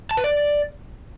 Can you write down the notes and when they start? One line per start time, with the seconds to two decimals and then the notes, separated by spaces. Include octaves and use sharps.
0.11 A5
0.17 B4
0.24 D5